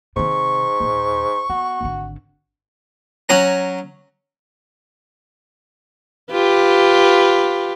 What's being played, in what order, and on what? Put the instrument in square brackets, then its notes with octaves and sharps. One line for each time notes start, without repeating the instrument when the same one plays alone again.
[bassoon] G#2 [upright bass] C3 D#3 [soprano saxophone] C#6
[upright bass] D#2 A#2
[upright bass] B3 [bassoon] F#4
[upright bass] G#1 D3
[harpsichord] F#3 C#4 A#5
[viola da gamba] F4 G4 B4